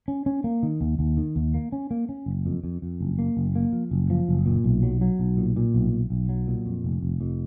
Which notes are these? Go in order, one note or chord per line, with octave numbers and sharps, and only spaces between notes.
C#4
C#4
A#3
D#3
D#2
D#2
D#3
D#2
A#3
C#4
A#3
C#4
F#1
F2
F2
F2
F#1
A#3
F#1
A#3
F3
F#1
F3
F#1
A#2
B1
F#3
F#3
B1
A#2
A#2
B1
B1
B1
F#3
A#2
F2
F1
F1
F2